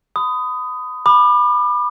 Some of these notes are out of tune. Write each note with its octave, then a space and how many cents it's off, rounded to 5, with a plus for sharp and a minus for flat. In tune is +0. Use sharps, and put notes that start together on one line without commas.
B5 +30 D#6 +0
B5 -5 D6 +40